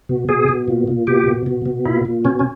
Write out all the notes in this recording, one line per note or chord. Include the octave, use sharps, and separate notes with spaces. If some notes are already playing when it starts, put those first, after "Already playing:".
B2
B2 G#4
B2
A#2
A#2
B2 G4
B2
B2
B2
A#2 E4
A#2
B2 C#4
C#4